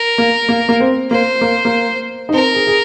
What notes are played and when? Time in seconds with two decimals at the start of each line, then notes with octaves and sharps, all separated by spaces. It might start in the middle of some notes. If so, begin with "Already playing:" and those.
Already playing: A#4
0.18 A#3
0.49 A#3
0.69 A#3
0.80 C4
1.11 A#3 C5
1.41 A#3
1.65 A#3
2.29 D#4
2.34 C4 A#4
2.55 G#4
2.67 G#4